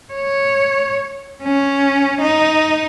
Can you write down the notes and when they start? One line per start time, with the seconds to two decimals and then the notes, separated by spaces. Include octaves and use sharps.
0.14 C#5
1.43 C#4
2.21 D#4